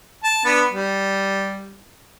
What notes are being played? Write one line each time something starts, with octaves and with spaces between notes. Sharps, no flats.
A5
B3 D4 B5
G3